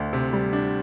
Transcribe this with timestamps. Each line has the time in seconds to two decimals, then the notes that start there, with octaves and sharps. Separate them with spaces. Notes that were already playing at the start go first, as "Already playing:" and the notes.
Already playing: D2 D4
0.13 C3
0.33 G3
0.53 D4